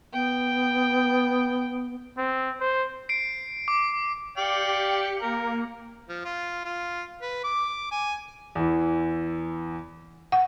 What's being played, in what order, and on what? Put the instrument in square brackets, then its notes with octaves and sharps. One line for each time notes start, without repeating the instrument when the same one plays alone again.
[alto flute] B3 [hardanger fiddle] G5
[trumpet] C4
C5
[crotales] C7 D7
D6
[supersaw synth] G4 C#7 [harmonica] D5 F5 G5
[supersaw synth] A#3 [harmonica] A#4
[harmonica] F3
F4
F4
B4
D6
G#5
[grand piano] E2 E3
[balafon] F#5